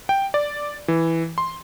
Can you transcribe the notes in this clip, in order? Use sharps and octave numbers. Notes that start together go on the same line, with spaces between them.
G5
D5
E3
C6